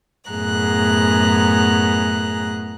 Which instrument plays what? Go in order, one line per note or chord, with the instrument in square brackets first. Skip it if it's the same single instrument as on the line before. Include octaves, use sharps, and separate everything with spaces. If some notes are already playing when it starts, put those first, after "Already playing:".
[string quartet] F#2 A2 B3 G#4 A#5 F#6